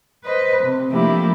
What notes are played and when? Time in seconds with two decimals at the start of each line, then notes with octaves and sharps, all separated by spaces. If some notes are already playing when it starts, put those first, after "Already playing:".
0.24 B4 C5 D#5
0.62 C3
0.91 F3 A3 A#3 D4 E4 G4